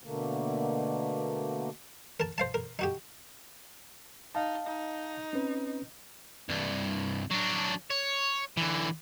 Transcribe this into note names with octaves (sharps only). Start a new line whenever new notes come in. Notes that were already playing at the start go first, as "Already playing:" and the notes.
B2 D3 A3 A#3
A#4 A5
C5 F5 A5
A#4
D#4 F#4 G4
D#4 F5 A5
D#4
C4 C#4 B4
C2 G2
F#3 D4
C#5
D3 E3